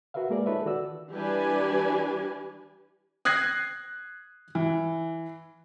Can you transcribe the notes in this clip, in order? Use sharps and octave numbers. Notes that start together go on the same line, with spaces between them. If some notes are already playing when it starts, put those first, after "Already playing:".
F#4 A#4 B4 E5 F5
G#3 A#3 G#4 A#4 B4 D5
D#4 F4 A4 B4 C#5 E5
D#3 F#4 D5 E6
E3 G3 D4 G4 B4 G#5
D#6 F#6 G#6 A#6 C7
E3